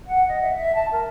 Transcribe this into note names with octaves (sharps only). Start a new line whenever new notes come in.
F#5
D#5
E5
E5
A5
A#4